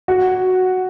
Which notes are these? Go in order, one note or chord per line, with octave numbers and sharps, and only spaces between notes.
F#4